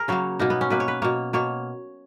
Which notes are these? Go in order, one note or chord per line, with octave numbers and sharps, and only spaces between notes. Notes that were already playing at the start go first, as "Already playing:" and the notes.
Already playing: G#4 A#4
C#3 F#3 A#3 C#5
B2 A#3 D#4
B3
C#4
B2 A#3 B4
C#5
B4
B2 A#3 C#5
B2 A#3 C#5